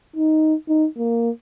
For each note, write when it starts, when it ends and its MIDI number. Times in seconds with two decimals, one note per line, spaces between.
0.16 0.55 63
0.69 0.86 63
0.97 1.30 58